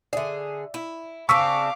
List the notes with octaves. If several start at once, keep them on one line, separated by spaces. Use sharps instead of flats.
D3 G#4 D5 E5
E4
C#3 C4 D4 F5 C#6 D6 E6 B6